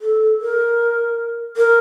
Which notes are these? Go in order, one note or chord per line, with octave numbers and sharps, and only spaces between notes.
A4
A#4
A#4